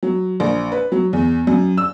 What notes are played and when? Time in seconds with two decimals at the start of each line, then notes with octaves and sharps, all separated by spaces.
0.03 F#3
0.40 A#1
0.72 B4
0.92 F#3
1.13 E2
1.47 F#2
1.77 E6